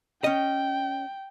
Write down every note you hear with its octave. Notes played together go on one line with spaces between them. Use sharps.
C#4 D#5 G5